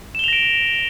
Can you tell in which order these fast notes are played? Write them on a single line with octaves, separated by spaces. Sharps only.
E7 G7 F7 A#6 D7